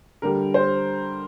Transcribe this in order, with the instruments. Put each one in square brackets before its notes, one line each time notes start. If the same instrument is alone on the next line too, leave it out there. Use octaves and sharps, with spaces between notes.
[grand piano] D3 G3 A#4
C5